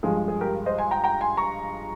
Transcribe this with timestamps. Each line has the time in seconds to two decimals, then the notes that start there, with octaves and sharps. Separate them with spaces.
0.03 G2 F3 G#3 G#4
0.28 G#4
0.41 G4 A#4
0.66 C5 D#5
0.78 G#5 C6
0.91 G5 A#5
1.04 G5 A#5
1.21 G#5 C6
1.37 A#5 C#6